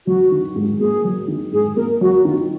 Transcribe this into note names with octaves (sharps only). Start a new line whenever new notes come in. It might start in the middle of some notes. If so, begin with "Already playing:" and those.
F#3 F#4
D#3
G#2
A#3 G#4
F#3
D#3
G#2 G#4
A#3 A#4
F#3 F#4
D#3 F4